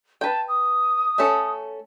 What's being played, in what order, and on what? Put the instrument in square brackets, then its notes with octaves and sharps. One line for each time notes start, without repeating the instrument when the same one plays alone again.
[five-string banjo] B4 G5 [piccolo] A5
[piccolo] D#6
[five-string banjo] A3 C#4 A4